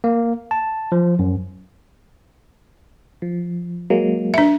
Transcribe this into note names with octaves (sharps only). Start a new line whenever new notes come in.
A#3
A5
F3
F#2
F3
F#3 G#3 A#3
D4 E5